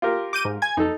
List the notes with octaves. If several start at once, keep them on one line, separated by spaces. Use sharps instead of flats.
F4 G4 A#4
D6 G6 D#7
G#2
G#5 G#6
F2 D#4 A4